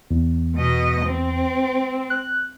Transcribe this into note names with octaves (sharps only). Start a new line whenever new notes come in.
E2
B2 D#5
C4
F#6